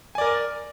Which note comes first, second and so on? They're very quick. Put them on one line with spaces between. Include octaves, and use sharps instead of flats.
G#5 D5 A#4